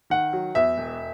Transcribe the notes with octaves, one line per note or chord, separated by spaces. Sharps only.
D#3 F#5
F#3
E2 E5
E1